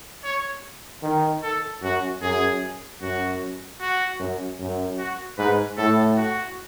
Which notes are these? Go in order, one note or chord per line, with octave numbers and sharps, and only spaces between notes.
C#5
D#3
A4
F#2 F#4
F#2 G#4
F#2 F#4
F#4
F#2
F#2
F#4
G#2 B4
A2 A4
F#4